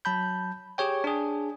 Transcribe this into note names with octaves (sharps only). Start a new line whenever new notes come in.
F#3 A5 B5 G6
G4 G#4 C#5 G5
D4 G#4